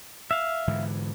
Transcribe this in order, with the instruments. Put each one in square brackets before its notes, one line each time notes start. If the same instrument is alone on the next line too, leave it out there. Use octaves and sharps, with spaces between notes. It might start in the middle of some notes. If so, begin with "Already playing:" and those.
[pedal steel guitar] E5 F5
[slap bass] G#2 D3 E3